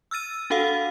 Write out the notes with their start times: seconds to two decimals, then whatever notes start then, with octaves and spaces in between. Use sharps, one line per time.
0.11 E6 F6 A6 D#7
0.50 D4 F#4 A4 F5 F#5